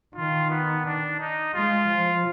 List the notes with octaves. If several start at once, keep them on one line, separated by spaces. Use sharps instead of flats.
D#3 F4
B3
D4
D#4
G#3 F4
F3